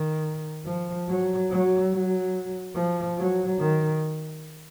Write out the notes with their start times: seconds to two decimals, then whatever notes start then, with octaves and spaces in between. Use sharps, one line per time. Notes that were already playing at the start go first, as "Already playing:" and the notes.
Already playing: D#3
0.65 F3
1.08 F#3
1.50 F#3
1.92 F#3
2.75 F3
3.17 F#3
3.59 D#3